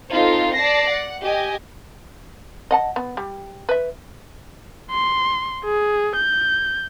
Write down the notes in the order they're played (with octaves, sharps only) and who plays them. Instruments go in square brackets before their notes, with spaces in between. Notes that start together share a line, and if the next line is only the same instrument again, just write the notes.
[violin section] C4 D#4 F4 A4
D5 A5 A#6 C7
F#5
G4 D#5 G#5
[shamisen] D#5 F#5 A5
B3
G3
B4 E5
[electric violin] C6
G#4
G6